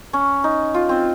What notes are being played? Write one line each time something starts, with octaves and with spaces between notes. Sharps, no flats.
C#4
D#4
F4
C4